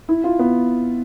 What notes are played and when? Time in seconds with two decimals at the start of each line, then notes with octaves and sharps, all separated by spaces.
0.09 E4
0.24 F4
0.39 B3